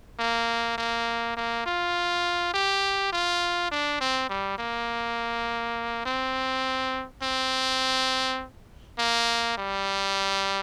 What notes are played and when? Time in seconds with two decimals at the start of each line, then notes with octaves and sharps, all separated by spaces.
0.19 A#3
0.78 A#3
1.37 A#3
1.66 F4
2.54 G4
3.12 F4
3.71 D4
4.01 C4
4.29 G3
4.58 A#3
6.05 C4
7.22 C4
8.98 A#3
9.58 G3